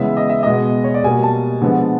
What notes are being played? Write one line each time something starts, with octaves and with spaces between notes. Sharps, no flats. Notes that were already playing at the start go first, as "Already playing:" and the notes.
Already playing: C#3 E3 G#3 B3 E5
D#5
E5
B2 G#3 B3 D#5
C#5
D5
B2 G3 A#3 G#5
A5
D3 F3 G#3 B3